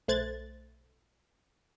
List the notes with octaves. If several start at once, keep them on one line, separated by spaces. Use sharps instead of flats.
B1 A3 C5 F#6 G#6 A6